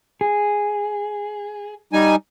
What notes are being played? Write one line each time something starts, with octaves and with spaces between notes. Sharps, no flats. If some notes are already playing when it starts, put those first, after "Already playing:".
G#4
G3 D#4 G#5